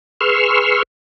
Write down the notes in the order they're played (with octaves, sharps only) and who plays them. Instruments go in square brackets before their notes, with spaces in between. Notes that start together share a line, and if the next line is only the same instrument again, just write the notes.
[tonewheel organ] G#4 B4 C6 C#6 E6 F6